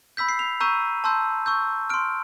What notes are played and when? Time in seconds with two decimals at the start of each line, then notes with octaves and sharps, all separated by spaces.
0.17 B5 E6 G6 B6
0.29 C7
0.39 F7
0.61 A#5 C#6 E6 G6 D#7
1.04 A5 C6 E6 G6
1.46 C#6 E6 G6
1.90 C6 F6 D7